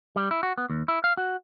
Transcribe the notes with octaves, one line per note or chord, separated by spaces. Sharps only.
G3
E4
F#4
B3
D#2
E4
F5
F#4